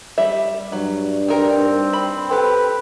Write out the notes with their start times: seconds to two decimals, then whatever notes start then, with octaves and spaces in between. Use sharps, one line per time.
0.18 G3 E5
0.72 G2 F#3
1.28 C4 D#4 A#4
1.93 B5
2.31 G4 A4 B4